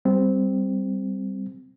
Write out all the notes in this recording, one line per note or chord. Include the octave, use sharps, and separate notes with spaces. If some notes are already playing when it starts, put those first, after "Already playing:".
G3 C4